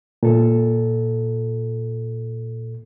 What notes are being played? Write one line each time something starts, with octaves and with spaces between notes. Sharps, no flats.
A#2 A4